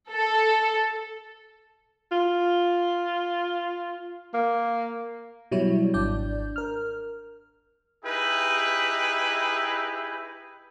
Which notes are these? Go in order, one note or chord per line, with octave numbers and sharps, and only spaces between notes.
A4
F4
A#3
B2 F#3 G3 E4 C#5
G#1 D4 D5 G6
A#4 F6
D#4 E4 G4 G#4 B4